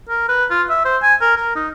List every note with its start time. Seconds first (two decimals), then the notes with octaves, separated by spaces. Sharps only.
0.09 A#4
0.29 B4
0.51 F4
0.70 E5
0.85 C5
1.03 G#5
1.21 A#4
1.37 A#4
1.56 D#4